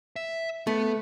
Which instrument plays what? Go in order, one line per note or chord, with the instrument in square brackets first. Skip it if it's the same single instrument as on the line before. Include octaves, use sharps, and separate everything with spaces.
[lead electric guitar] E5
[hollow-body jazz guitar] A3 [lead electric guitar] B3